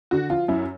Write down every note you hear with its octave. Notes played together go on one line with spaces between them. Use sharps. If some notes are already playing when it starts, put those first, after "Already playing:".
D3 F#4
F3 F4
F#2 E4